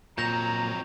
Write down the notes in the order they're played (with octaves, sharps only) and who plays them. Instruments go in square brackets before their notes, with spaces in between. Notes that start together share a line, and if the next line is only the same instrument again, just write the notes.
[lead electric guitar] F2 F#3 [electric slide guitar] A#2 [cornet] A#5 [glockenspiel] G6 A#6 F7